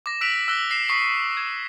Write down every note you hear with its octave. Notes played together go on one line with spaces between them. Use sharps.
D6 A#6
E6 F#6 B6 D7 F7 F#7
E6 F#6 A#6 G7
A#6 C7 E7
C#6 D#6 B6 C7
G#6